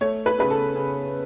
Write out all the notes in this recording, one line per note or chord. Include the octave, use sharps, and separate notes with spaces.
A3 C#5
B4
C#3 B4
A4
C#3